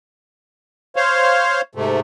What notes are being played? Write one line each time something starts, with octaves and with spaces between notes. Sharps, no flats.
C5 C#5 F5
G#2 C3 A3